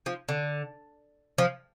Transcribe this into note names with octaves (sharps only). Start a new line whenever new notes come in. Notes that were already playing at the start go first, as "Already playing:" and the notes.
F3
D3
F3